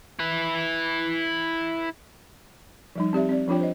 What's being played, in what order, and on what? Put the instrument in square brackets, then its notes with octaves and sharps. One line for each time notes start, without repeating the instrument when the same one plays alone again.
[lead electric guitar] E4 B4
[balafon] F3 G3 D#4
C4 G4 D5 E5
C4 D5
F3 D4 F4 C#5 G5
C5 D#5